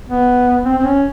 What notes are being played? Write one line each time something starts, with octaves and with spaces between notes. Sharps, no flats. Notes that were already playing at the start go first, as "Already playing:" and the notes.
B3
C4
C4
C#4